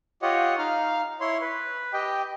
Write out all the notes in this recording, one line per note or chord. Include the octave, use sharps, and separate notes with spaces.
F4 G4 C#5 D#5 F#5
D#4 F5 F6
E4 C#5 C6
B4
G4 D#5 G5